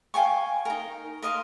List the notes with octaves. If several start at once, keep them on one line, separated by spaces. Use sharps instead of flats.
F5 G5 G#5 C#6
D#4 A#4
A#4 D#5 F5 C6